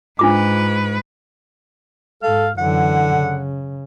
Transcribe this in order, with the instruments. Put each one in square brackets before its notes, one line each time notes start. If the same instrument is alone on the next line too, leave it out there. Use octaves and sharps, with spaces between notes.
[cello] G#2 B4 [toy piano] D4 F4 D6
[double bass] G#2 [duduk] A4 [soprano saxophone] F5
[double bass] F#2 E3 [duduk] D3 [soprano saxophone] F#5
[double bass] C#3